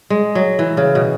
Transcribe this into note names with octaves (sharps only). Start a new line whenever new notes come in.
G#3
F#3
E3
C#3
B2